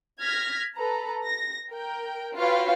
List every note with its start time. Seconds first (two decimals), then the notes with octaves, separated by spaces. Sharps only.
0.21 F6 G#6 A#6 B6
0.75 A4 B4 A#5
1.24 A#6
1.69 A#4 G5
2.35 F4 F#4 B4 C#5 F5 G5